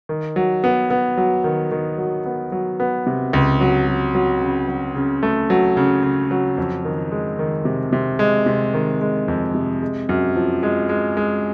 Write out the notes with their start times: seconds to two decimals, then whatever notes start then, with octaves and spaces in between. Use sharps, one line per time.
0.09 D#3
0.36 F#3
0.64 B3
0.90 B3
1.17 F#3
1.44 D#3
1.72 D#3
1.98 F#3
2.26 B3
2.52 F#3
2.80 B3
3.07 C3
3.33 C#2
3.61 F#3
3.87 F#3
4.15 F#3
4.41 C#3
4.68 F#3
4.95 C#3
5.23 A3
5.50 F#3
5.77 C#3
6.04 C#3
6.31 F#3
6.58 F2
6.85 D#3
7.12 G#3
7.39 D#3
7.65 C3
7.93 C3
8.19 G#3
8.46 C3
8.74 D#3
9.01 G#3
9.28 F2
9.55 C3
9.82 G#3
10.09 F#2
10.36 F3
10.63 G#3
10.89 G#3
11.17 G#3